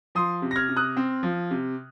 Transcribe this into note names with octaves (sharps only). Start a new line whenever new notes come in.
F3 C6 D#6
C3
A#6
F6 G#6
C3
D#6 F#6
C4
F3
C3